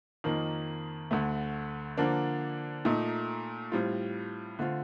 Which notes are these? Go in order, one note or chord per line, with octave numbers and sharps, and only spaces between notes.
F2 D#3 A#3 D#4
D2 D3 A3
D3 F3 A#3 D4
A#2 A3 D#4
A2 G3 C4 F4
D3 A3 C4 F4